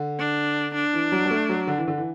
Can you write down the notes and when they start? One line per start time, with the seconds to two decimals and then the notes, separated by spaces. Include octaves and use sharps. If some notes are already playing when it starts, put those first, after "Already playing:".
Already playing: D3
0.19 D4
0.75 D4
0.93 E3
1.12 F#3
1.26 F#3
1.31 A3
1.49 F#3
1.67 D3
1.78 E3
1.88 D3
1.98 E3